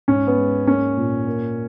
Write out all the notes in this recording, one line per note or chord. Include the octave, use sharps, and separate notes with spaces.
G#2 C#4
B3
G#3
A#3 C#4
A#2
A#3